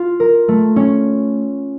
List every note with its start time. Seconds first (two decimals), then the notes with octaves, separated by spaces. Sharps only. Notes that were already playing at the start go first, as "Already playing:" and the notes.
Already playing: F4
0.20 A#4
0.48 A3
0.76 C#4